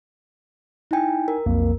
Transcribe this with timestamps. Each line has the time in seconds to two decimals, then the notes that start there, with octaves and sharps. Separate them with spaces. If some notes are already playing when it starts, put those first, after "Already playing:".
0.91 D#4 E4 G5 G#5
1.28 A#4
1.46 B1 F2 A#3